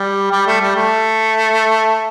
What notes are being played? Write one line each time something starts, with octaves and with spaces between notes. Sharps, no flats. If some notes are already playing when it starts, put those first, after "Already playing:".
Already playing: G3
G3
A3
G3
A3